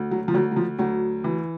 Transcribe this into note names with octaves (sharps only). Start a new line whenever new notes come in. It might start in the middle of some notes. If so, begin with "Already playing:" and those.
Already playing: D2
F#3
F3
D2 F#3
F#3
F3
D2 F#3
E3